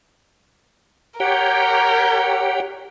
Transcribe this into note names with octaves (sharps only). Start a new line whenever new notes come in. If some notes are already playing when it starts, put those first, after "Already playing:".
G4 A#4 C#5 F#5 G5